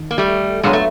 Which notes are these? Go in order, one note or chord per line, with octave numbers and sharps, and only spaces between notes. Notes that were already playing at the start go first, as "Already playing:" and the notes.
Already playing: D#3
A#3
G3 A3
F#3 G#3 B3 D4 F4 A4
A3